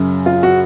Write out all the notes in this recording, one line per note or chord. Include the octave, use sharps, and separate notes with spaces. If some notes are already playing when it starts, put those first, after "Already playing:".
Already playing: F#2 C#3
F4
F#4